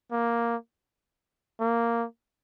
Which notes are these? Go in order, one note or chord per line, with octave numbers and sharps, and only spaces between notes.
A#3
A#3